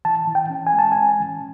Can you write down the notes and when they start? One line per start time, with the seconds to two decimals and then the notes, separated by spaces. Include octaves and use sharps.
0.05 E3 A5
0.27 E3
0.35 G5
0.50 C#4
0.67 G#5
0.73 G#3
0.79 A5
0.92 C#4 G#5
1.20 E3